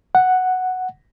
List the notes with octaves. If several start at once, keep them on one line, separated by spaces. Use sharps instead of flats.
F#5